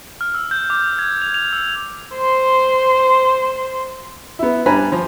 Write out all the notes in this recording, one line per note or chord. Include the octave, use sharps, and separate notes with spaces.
F6
E6
G6
D6
G#6
F7
F7
E6
C5 C6
B3 E4
G2 D4 B4 G#5 A#5 B5
F3